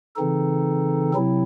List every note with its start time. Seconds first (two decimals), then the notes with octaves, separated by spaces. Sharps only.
0.16 C#3 E3 C4 D#4 A4
1.14 C3 F#3 C4 E4